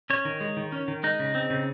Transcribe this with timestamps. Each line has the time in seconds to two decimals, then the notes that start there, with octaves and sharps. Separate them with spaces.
0.10 C#4 C#5
0.25 D#3
0.41 G#3
0.57 D#3
0.72 C#4
0.88 D#3
1.03 G#3 D#4
1.19 C#3
1.35 C4
1.50 C#3